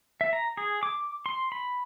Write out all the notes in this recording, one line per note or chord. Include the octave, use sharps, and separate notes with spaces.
E5
A#5
G#4
D6
C6
B5